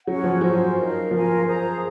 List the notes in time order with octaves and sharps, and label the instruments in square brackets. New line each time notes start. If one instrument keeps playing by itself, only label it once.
[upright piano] F#3 [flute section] C#4 F#4 C#5 F#5
[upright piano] F3
[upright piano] F#3 [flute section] C#4 F4 C5
[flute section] D#4 A#4 F5
[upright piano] F3 [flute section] F4 A#4 F5 G#5
[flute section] G#4 C5 F5 A#5